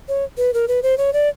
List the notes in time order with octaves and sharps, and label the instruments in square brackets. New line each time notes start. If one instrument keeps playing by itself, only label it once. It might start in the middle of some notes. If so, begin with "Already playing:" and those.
[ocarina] C#5
B4
A#4
B4
C5
C#5
D5